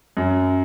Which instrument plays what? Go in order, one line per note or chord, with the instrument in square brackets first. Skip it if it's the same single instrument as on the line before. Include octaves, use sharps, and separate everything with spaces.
[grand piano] F#2